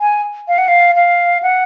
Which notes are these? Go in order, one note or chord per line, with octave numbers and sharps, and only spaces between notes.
G#5
F5
F#5
F5
F5
F#5